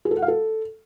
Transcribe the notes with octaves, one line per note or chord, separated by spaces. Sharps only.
G#4
A4
F#5
F5
A4